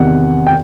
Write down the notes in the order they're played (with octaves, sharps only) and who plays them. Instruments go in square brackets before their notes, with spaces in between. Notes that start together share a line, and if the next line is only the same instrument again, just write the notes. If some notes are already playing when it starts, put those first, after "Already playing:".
Already playing: [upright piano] E2 C3 D#3 F#5
G5